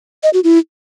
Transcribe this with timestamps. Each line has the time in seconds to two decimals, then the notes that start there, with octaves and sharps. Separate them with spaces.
0.23 D#5
0.33 F#4
0.44 E4